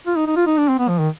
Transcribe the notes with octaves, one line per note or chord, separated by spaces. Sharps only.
F4
D#4
D#4
F4
D#4
D4
C4
B3
F3
D#3